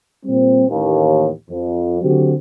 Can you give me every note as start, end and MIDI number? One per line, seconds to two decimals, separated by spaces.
0.25 0.64 46
0.25 0.64 55
0.25 0.64 60
0.69 1.27 33
0.69 1.27 39
1.49 1.99 41
2.01 2.32 50
2.01 2.32 54
2.01 2.32 60
2.01 2.32 66
2.01 2.32 67